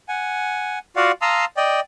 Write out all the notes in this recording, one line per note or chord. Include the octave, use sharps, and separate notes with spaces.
F#5 G#5
F4 F#4 D5 F5 F#5
F5 A5 A#5 C6 D#6 E6
D5 D#5 G5